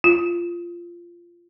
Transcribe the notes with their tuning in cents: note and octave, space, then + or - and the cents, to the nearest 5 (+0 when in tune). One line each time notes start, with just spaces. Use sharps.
F4 -15